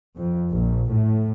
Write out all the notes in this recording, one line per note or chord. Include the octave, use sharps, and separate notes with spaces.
F2
A#1
A2